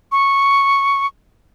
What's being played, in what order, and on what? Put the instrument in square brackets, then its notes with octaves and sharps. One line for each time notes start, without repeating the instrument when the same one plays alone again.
[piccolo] C#6